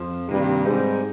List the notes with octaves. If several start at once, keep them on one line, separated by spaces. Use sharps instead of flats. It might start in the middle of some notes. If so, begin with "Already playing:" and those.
Already playing: F2 F3
G2 C3 D#3 A#3
G#2 G3 C4 D#4